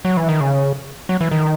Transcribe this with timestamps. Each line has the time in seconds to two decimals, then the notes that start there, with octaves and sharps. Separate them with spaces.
0.05 F#3
0.17 E3
0.29 D#3
0.41 C#3
1.09 F#3
1.21 E3
1.31 D#3